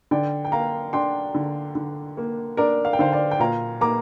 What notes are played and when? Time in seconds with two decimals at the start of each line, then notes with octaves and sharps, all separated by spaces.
0.11 D3 D5 G5
0.45 G5
0.52 A#3 F5 A#5
0.93 D4 G5 C6
1.35 D3
1.75 D3
2.17 A#3
2.57 D4 A#4 D5
2.85 F5
2.93 G5
2.99 D3 C5 F5
3.12 D5 G5
3.31 G5
3.39 A#2 F5 A#5
3.81 A#3 A#5 D6